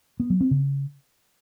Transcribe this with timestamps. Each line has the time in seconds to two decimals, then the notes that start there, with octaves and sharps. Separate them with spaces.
0.20 B3
0.30 F#3
0.40 C4
0.51 C#3